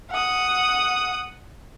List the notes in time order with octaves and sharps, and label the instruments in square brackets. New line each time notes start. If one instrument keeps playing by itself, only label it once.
[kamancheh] F#5 D#6